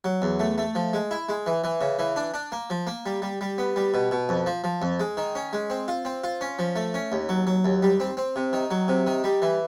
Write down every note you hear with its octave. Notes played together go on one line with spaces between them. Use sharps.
F#3
E2
A3
A3
F3
G#3
E4
G#3
E3
E3
C#3
E3
D4
D4
A#3
F3
A#3
G3
G3
G3
B3
G3
B2
B2
F2
F3
F3
F2
G#3
D#3
C#4
G#3
C4
F4
C4
F4
C#4
F3
A3
C#4
D#2
F#3
F#3
D#2
G3
C4
C4
C3
D#3
F#3
C3
D#3
G3
E3